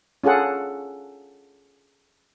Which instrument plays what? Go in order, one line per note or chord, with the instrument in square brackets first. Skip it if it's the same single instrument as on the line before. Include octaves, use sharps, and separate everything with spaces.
[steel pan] C#4 F4 G#4 A4 F#5